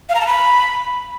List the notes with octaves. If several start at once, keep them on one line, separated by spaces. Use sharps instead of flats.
F5
A#5
A5
B5